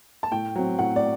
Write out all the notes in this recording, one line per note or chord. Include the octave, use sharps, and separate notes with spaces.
A5
A2 G5
F#3 C4
A2 F#5
D5